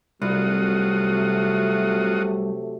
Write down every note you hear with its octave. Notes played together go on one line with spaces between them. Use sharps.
C2 C3 F#3 A3 F4 F#4 D#6